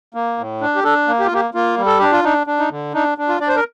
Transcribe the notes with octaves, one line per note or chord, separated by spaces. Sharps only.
A#3
A2
D4
G4
D4 A4
A#3
G4
F4
A#3 G4
A#3 F4
G3
A4
D4 G4
F4
D4 D#4
D4
D#4
D3
D4 D#4
D4
F4
D4 D5
C5
A#4